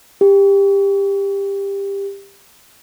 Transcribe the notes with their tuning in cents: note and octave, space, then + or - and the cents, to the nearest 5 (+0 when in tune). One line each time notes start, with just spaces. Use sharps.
G4 +20